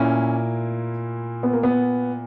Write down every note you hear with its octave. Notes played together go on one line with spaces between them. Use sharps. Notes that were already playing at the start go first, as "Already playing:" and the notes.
Already playing: A#2 A#3 C#4 E4
B3
A#3
B3